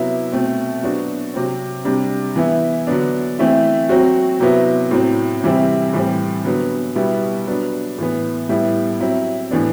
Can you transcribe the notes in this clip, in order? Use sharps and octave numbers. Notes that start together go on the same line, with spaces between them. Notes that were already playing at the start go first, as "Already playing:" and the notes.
Already playing: C3 F#3 B3 E4
B2 A3 C4
F#3 B3 D4 F#4
C3 F#3 C4
C3 G3 D4
E3 B3 E4
D3 F#3 B3 D4
E3 A3 C4 E4
F#3 C4 F#4
C3 F#3 B3 E4
A2 F#3 C4
C3 E3 G3 C4 E4
A2 E3 G3 C4
D3 F#3 B3
B2 G3 B3 E4
F#3 B3 D4
A2 E3 B3
A2 G3 B3 E4
F#3 C4 E4
A2 E3 B3 D4